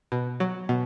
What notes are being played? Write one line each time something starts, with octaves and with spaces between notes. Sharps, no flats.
B2
F#3
B2